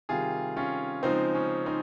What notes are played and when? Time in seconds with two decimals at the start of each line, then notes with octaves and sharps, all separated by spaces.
0.09 C3 D#3 G3 F4 G#4
0.57 C#4 F4
1.03 C#3 F3 G#3 C4 D#4
1.35 C#4
1.66 C4 D#4